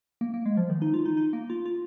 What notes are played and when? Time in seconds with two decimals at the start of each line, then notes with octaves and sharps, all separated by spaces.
0.21 A#3
0.34 A#3
0.46 G#3
0.57 F3
0.70 D#3
0.82 D#4
0.94 F4
1.06 D#4
1.17 D#4
1.33 A#3
1.50 F4
1.66 F4